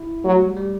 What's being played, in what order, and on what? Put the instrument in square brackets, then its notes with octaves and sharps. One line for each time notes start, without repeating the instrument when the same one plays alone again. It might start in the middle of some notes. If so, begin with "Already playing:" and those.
Already playing: [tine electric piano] E4
[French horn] F#3 [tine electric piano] A3
[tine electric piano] G3
G3